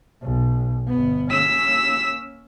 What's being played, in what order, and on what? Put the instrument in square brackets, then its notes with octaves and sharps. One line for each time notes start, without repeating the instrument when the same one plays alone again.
[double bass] B1
G1 B3
[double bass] A#3 C#4 [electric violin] E6 B6